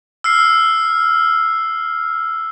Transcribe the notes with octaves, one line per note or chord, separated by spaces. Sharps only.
E6 F6 C7